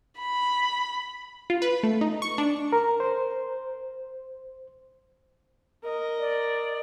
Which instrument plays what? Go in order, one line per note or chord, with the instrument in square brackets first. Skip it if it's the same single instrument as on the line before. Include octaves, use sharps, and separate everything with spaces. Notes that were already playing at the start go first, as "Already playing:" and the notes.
[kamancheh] B5
[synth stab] F4
B4
A3
D#4
C#6
D4
[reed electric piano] A#4
C5
[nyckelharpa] A#4 D#5
[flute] D5